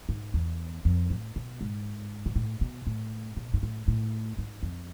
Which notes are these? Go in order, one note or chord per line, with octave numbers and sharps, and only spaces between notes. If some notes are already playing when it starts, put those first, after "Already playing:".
G#2
E2
F2
A2
B2
G#2
B2
A2
B2
A2
B2
G#2
A2
A2
G#2
F2